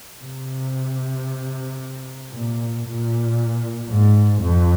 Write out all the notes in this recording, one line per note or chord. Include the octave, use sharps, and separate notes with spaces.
C3
A#2
A#2
G#2
F2